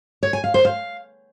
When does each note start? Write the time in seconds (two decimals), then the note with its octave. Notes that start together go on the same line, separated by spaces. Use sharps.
0.23 C#5
0.33 G#5
0.44 F5
0.54 C5
0.65 F5